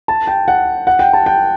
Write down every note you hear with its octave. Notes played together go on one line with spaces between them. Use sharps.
A5
G5
F#5
F#5
G5
A5
G5